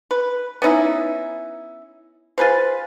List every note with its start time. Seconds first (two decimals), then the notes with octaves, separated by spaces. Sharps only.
0.11 B4
0.62 B3 C#4 D#4 E4
2.38 F4 G#4 B4 C5